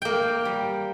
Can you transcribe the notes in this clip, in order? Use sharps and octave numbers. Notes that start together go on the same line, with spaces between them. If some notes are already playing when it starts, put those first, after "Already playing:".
A#3 G5
G3